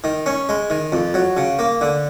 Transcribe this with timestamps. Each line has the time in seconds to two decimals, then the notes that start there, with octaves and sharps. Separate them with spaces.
0.04 D#3
0.26 C#4
0.49 G#3
0.70 D#3
0.92 F2
1.14 F#3
1.37 C#3
1.59 A#3
1.81 D3